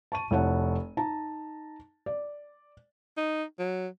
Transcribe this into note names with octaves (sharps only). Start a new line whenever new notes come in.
A5 C#6 D#7
F1 E4 C#5 F#5 A5
D#4 A5 A#5
D5
D#4
F#3